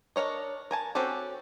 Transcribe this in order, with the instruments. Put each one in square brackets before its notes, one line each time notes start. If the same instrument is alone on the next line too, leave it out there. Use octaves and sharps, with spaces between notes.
[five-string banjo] D4 A#4 C#5 D#5
A#4 G#5 A5
C4 C#4 F#4 G4 A4